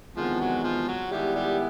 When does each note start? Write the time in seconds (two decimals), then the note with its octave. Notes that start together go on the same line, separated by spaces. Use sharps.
0.16 E2 C3 D#3 F3 G#3 B3
0.40 F#3
0.64 F3
0.88 F#3
1.11 D#3 G3 G#3 B3 E4 G4
1.35 G3